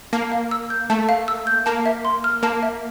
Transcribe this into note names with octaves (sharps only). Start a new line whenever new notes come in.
A#3 A5
F5
E6
G6
A3 A5
F5
E6
G6
A#3 A5
E5
C6
F6
A#3 A5
E5